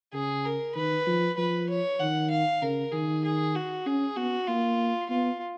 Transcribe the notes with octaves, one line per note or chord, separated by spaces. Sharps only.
C#3 G#4
A#4
D#3 B4
F3
F3 B4
C#5
D#3 F#5
F5
C#3 A#4
D#3 G#4
G#4
F#4
C#4 G#4
B3 F#4
A#3 F4
B3 F4